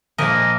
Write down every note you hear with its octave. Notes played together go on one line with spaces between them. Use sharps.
A#2 F3 A#3 A#4 D#5